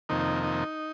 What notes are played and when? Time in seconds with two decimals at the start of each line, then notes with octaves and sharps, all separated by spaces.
0.09 F2 C3 D#3 A#3 D#4
0.44 D#4